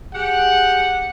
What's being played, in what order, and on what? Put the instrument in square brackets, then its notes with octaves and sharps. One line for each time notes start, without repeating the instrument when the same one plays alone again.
[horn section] G4 G#4 F#5